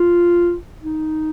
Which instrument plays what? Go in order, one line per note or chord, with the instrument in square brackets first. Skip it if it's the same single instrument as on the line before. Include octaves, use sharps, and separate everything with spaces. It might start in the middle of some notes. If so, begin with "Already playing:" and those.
Already playing: [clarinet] F4
D#4